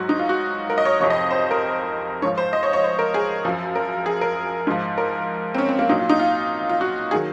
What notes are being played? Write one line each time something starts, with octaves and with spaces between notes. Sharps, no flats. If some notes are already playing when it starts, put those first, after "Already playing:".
Already playing: G#2 F#3 F#4
D#4
F4
F#4
A#4
D#5
C#5
F2 C3 F3 C#5
D#5
C5
A#4
G#2 F3 C#5
C5
D#5
C#5
C#5
C5
A#4
G#4
F#2 F3
A#4
G#4
A#4
G#2 F3
A#4
C4
C#4
C4
A#3
A#2 F#3 D#4
F4
D#4
F4
F4
F#4
D#3 F#3 G#4